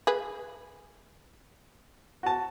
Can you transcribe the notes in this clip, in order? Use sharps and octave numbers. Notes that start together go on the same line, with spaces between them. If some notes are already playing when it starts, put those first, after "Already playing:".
G#4 B4
F#4 A5